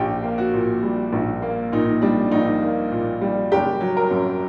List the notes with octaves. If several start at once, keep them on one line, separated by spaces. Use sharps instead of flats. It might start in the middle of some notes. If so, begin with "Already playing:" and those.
Already playing: A#1 G4
A#3
F#4
A#2
G3
A#1
A#3
A#2 D#4
G3 D4
A#1 D#4
A#3
A#2
G3
F#1 G4
F#3
A#4
F#2